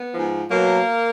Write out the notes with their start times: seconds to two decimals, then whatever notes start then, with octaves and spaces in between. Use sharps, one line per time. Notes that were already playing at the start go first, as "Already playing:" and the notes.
Already playing: B3
0.14 G#2 F3
0.50 B2 F#3 A#3